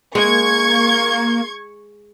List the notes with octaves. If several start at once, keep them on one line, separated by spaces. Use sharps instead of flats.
G#3 A#3 C#6 G#6